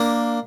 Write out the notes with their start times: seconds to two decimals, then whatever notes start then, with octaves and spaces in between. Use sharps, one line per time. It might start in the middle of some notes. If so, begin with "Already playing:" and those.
Already playing: A#3 D4